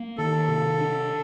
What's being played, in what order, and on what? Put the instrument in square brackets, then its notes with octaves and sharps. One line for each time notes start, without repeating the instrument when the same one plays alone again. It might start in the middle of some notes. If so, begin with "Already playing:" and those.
Already playing: [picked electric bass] A#3
[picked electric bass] D#3 [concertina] A4
[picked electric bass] C3
D4